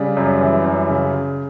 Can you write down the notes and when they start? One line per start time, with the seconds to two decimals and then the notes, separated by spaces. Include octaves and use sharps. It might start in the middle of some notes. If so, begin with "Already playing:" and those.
Already playing: C#3 G3
0.17 F#2
0.41 E3
0.65 F#2
0.89 C#3